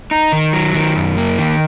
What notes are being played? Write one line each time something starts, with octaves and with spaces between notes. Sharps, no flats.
D#4
D#3
F#3
D#3
F#2
A#3
D#3